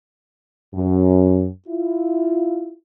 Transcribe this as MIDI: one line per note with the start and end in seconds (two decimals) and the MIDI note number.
0.75 1.47 42
1.69 2.73 64
1.69 2.73 65